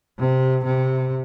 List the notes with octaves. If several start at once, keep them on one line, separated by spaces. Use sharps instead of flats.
C3
C3